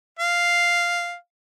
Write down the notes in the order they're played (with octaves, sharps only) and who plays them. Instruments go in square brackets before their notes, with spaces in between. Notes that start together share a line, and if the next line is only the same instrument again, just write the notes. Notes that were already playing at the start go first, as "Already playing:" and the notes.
[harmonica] F5